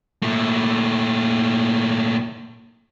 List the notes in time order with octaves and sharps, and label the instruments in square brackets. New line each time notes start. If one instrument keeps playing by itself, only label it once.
[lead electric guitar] A#2 A3